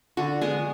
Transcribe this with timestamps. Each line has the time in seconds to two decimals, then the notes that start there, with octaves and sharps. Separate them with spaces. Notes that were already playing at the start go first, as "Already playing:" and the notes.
0.17 D3 F#4
0.41 G#3 B3 G#4